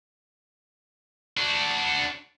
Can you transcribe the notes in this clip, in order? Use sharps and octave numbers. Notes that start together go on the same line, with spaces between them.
D4 F#4